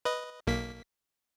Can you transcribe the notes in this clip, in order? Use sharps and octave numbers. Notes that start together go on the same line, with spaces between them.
B4 D#5
B1 A#3 B6